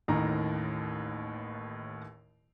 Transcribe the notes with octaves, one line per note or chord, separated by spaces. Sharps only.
A1 D#2 A2 D#3 A#5